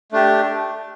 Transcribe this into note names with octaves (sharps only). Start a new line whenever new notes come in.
A3 D4 G4